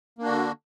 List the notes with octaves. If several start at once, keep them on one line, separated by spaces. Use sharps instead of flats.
D3 A#3 D4 F#4